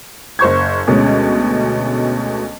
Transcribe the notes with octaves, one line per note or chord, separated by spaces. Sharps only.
F#1 C5 C#6 G#6
D2 B2 G#3 C#4